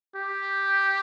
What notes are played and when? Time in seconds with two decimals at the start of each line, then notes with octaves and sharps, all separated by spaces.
0.16 G4